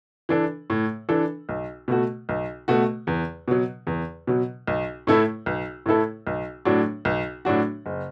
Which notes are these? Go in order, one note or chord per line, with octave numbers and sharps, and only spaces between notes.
E3 D4 A4
A2
E3 D4 A4
B1
B2 A3 F#4
B1
B2 A3 F#4
E2
B2 F#3
E2
B2 F#3
B1
A2 A3 E4 A4
B1
A2 A3 E4 A4
B1
A2 F#3 D4 F#4
B1
A2 F#3 D4 F#4
F#1